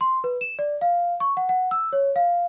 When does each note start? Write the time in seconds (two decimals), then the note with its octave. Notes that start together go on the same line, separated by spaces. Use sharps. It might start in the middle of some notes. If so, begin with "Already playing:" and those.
0.01 C6
0.24 B4
0.41 E7
0.59 D5
0.81 F5
1.20 C#6
1.37 F#5
1.49 F#5
1.71 E6
1.93 C#5
2.16 F5